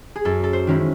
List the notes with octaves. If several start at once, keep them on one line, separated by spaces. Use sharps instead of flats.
G#4
F#2 A4
A4
C5
D#3 G#3 C#4 E4